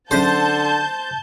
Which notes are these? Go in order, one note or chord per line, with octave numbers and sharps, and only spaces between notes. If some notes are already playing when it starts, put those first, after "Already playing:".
D3 F#3 C#4 G#4 C5 A5 G6